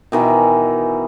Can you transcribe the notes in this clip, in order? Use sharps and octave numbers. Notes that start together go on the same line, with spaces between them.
B2 D#3 E3